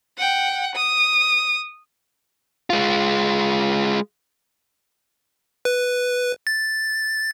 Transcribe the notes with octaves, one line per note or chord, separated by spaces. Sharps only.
F#5 G5
D#6
G#3 F4
B4
A6